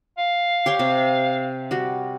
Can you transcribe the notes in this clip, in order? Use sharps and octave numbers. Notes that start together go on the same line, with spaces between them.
F5
G4 C#5 C6
C3
G3 F#4